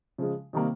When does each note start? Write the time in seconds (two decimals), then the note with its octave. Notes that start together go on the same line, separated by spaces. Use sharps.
0.18 C#3 F3 G#3
0.53 C3 D#3 G3 A#3